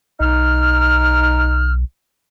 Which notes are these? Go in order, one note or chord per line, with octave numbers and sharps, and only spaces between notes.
B1 D#4 F6